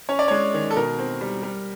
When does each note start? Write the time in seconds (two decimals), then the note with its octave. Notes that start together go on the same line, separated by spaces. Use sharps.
0.09 C#4 C#5
0.19 D5
0.28 G#3 C#5
0.54 D#3
0.71 A4
0.76 B2 A#4
0.99 C4
1.21 G3
1.43 G3